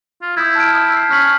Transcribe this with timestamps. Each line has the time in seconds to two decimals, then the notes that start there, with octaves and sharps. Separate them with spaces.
0.22 F4
0.37 E4 D#6 G6 G#6
0.55 A5 F6 D7
0.74 D#6
0.96 C7
1.10 C#4 F6 B6 F#7